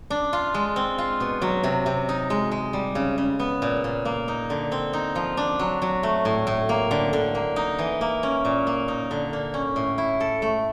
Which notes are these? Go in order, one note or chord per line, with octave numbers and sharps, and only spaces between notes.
D4
F4
G#3
C4
F4
B2
F#3
C3
C3
D#4
G#3
G#3
G3
C#3
C#3
B3
A#2
A#2
A#3
D#4
D3
C4
D#4
F3
D4
F#3
F#3
A3
A2
A2
A#3
D3
D3
A#3
D#4
E3
A#3
C#4
A#2
A#3
D#4
D3
A#3
C#4
A2
E4
A4
A3